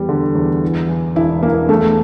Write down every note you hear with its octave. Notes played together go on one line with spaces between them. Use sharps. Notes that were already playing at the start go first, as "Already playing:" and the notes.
Already playing: E2 G3
D3
E2
E3
E3
E1 E4
E3 A#3
E2 A3